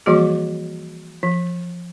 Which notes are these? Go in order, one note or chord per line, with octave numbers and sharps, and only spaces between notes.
E3 F3 G3 A#3 F#4 G#4
F3